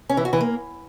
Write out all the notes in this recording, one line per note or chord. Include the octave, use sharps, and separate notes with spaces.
C#4
E3
F#4
E3
A#3